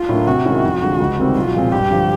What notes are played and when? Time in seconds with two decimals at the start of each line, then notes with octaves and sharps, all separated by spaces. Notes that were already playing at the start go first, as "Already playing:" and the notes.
Already playing: F4
0.09 A2 F#3 A#3 D4
0.27 C3 F#4
0.45 D#3 G#3 C#4 E4
0.63 F2
0.81 D3 F3 G#3
1.00 C#2
1.18 C3 D#3 G3 C4
1.36 B1 F4
1.54 A#2 F3 G#3 C4
1.72 G2 G4
1.90 D3 F3